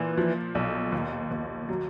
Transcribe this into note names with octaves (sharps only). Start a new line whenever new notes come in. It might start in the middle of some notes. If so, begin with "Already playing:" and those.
Already playing: A#2 E3
F3
B1
D#2
D#2
F#3